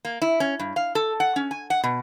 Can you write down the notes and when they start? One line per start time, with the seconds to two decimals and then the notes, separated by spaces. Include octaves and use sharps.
0.05 A#3
0.22 E4
0.40 C#4
0.59 G2
0.76 F5
0.95 A4
1.20 F#5
1.36 C#4
1.51 G#5
1.70 F#5
1.84 B2